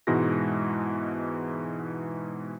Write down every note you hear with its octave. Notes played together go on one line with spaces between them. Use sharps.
G#2 B2 E3 G#3 F#4 A#6